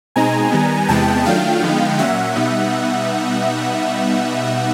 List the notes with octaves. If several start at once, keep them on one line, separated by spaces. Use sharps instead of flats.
B2 G#3 C4 D#4 G#5 A#5
D#3 G3 B3
E2 C3 E3 G#3 B3 G5 A5
D#3 F#3 A3 D4 F4 F5 G5
D3 F3 G#3 B3 D#4
A#2 F#3 A#3 C#4 E5 F#5
B2 G3 B3 D#4